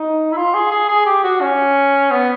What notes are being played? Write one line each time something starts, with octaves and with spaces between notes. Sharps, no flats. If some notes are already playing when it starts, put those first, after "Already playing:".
Already playing: D#4
E4
F4
G#4
G#4
G#4
G4
F#4
C#4
B3